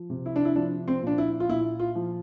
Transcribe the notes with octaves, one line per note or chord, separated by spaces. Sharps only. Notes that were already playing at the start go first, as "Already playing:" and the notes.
Already playing: F3
C3
E4
D4
E4
F3 D4
C4
A#2 D4
E4
F4
A#2 E4
F4
F3